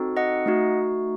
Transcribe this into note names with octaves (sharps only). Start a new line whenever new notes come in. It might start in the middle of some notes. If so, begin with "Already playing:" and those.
Already playing: C4 D#4 F#4 A4
D#5 F#5
A3 D#4 F#4